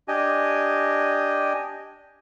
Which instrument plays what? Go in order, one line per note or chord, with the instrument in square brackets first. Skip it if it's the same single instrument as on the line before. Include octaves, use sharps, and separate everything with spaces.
[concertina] D4 G4 D#5 G#5